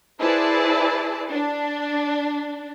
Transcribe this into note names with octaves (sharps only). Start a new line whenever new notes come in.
E4 G#4 B4 C5 D5 A5
D4